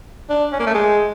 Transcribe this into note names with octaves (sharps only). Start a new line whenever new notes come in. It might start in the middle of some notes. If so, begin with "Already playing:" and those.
D4
C#4
A#3
A3
G#3